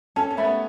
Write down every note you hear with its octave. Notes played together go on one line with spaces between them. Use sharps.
C#4 A4
C#4
A3 E5 B5
B3